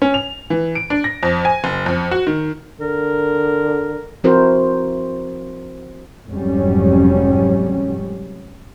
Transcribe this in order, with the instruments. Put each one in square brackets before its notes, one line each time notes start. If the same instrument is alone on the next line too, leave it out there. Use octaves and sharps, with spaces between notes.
[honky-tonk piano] C#4
F7
E3
D7
D4
A#6
F2
G#5
F#1
F2
F#4
D#3
[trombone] D3 [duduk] A#4
[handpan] F3 C4 E4 F#4 A#4 C5
[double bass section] F1 F2 G#2 F#3 G3 C#4